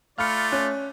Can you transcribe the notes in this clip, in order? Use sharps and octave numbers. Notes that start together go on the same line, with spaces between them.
A3 F4 D5 F5 B5 F6 C#7
C#4 F#6